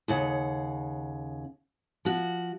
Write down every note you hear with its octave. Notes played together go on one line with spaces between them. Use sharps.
D#2 C#3 F#5
F3 F#4